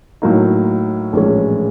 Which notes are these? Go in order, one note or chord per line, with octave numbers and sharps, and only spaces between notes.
A2 F#3 A#3 D#4
A#1 A2 E3 G#3 C#4